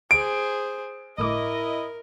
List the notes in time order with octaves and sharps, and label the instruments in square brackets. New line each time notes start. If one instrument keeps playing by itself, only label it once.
[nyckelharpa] G#4 C5 [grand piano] D7
[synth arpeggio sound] G1 A2 D6 [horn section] E4 D#5 [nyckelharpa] A#4